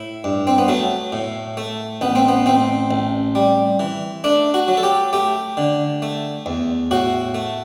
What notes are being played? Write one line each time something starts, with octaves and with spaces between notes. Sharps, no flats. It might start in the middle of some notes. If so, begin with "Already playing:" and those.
Already playing: A2 E4
G2
C4
B3
F#3 A3
A2
A3
A1 B3
C4
B3
A1 C4
A1
G3
E3
A3 D4
F#4
F#3
A4
G4
A3 G4
D3
A3
E2
A2 F#4
A3